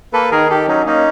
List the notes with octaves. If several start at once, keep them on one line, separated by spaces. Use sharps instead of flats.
A#3 A4 B4
D#3 G#4 A#4
D#3 G4 A4
F#3 C#4 D#4
A#3 C#4 D#4